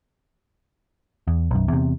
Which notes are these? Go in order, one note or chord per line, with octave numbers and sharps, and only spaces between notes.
E2
B1 F#2
E2 C3